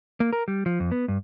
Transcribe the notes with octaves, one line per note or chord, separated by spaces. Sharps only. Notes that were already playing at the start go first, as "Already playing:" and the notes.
A#3
A#4
G3
F3
F2
B3
G2